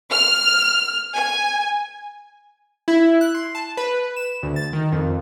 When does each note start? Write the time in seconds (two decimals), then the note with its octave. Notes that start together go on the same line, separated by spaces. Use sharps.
0.10 F6
1.15 G#5
2.88 E4
3.21 F#6
3.35 C6
3.55 A5
3.77 B4
4.16 E7
4.43 D2
4.56 A6
4.73 D#3
4.92 F2